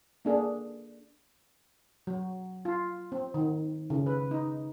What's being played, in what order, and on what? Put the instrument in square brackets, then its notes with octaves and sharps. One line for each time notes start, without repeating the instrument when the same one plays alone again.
[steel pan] A#3 D4 G#4
F#3
F4
C4
D#3
C#3
B4
D#4